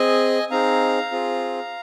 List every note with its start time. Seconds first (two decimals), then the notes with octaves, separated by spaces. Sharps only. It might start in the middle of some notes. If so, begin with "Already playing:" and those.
Already playing: C4 G#4 D#5 G#5
0.50 C4 D#4 G#4 F5 A#5
1.11 C4 F4 G#4